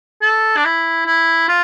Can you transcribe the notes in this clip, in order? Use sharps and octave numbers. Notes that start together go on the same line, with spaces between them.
A4
D4
E4
E4
F4